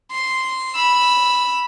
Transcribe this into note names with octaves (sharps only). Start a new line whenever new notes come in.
C6
B5 E6